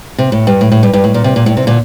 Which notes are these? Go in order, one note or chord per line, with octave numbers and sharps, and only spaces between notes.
C3
A2
G2
A2
A2
G2
G2
A2
A#2
C3
A#2
A2
C3
A#2 D3